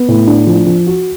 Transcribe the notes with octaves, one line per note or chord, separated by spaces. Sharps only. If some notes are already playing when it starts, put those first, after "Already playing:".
Already playing: B3
A2
D4
F3
F3
F#4